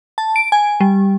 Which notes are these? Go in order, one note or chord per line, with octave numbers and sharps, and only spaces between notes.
A5
D7
G#5
G3